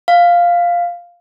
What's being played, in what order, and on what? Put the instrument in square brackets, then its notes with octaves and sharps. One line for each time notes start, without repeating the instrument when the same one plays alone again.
[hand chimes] F5